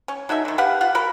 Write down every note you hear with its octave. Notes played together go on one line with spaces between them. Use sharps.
C#4
F#3 D#4 A4 E5
D3 D#3
G4 B4 F5 F#5
F4 F5 F#5
F#4 A#4 F5 B5